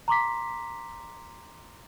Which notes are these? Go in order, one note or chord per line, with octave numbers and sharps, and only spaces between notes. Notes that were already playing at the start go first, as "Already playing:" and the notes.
A#5 C6 D6 B6